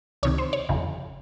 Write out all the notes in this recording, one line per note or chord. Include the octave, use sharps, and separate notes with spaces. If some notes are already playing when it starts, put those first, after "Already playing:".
C#2 C3 D#3 C#5
C5
C#5
G1 F2 C#3